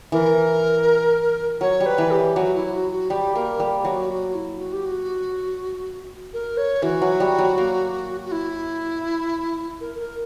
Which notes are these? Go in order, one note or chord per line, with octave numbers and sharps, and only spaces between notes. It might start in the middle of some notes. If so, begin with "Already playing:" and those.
E3 A#4
F#3 C#5
G3
B4
E3
G4
F#3 F#4
E4
F#4
F#4
G3 G4
A#3 A#4
G3 G4
F#3 F#4
F#4
E4
F#4
G4
F#4
A#4
C#5
E3 F#4
F#3
G3
F#3
A#3
F#4
E4
A#4
A#4